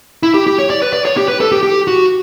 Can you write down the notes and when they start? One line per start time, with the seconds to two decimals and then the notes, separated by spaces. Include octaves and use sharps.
0.23 E4
0.34 G4
0.47 G4
0.59 C#5
0.70 D5
0.82 B4
0.93 D5
1.05 C#5
1.17 G4
1.28 B4
1.41 A4
1.52 G4
1.63 G4
1.87 F#4